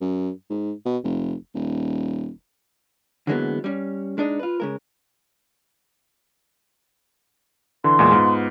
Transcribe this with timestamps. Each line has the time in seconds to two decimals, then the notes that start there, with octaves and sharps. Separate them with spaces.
0.01 F#2
0.50 G#2
0.86 B2
1.04 F1
1.55 D#1
3.27 D3 E3 F#3 G#3 A#3 B3
3.64 G3 C#4
4.18 G#3 D4 D#4
4.39 F4 B4
4.60 C#3 G#3 A#4
7.84 D3 E3 C6
7.99 E2 A#2 G#3
8.12 G#2 B3 F4